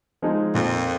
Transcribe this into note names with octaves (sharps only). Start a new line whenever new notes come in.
F3 G#3 D#4 G#4
F2 A#2